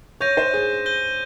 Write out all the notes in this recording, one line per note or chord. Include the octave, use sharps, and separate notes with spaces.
C#5 G6 A#6 D#7
C5
G#4
G6 A#6 D#7 G7